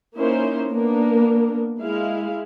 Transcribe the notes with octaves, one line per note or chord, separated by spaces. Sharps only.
A#3 C#4 D#4 E4 C5
A#3 B3 D4 A#4
G#3 E4 F5